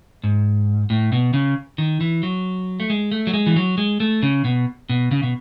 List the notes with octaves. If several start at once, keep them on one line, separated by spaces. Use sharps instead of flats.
G#2
A2
B2
C#3
D#3
E3
F#3
A3
G#3
A3
F#3
G#3
E3
F#3
G#3
A3
C#3
B2
B2
C#3
B2